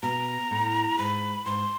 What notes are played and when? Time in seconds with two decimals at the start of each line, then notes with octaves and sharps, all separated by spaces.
0.03 B2 A#5
0.51 A2
0.98 G#2 B5
1.46 G#2 C6